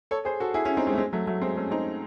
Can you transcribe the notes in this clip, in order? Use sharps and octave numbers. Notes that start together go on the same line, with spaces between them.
A4 C#5
G#4 C5
F#4 A4
E4 G#4
C#4 E4
C4 D#4
G#3 C4
A3
G#3 C4
F#3 A3
F#3 A3
G#3 C4
A3 C#4
C4 D#4